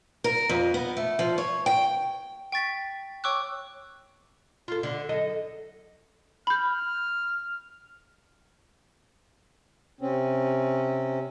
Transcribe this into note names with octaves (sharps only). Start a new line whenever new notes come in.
A#4
F2
B3
A3
F3
C#5
G5
G5 C#6 A6 B6
C#5 G5 C#6 D6 E6 F#6
F4 A4
D3
F#2 A4 D#5
B5 F6 G6
C3 C4 C#4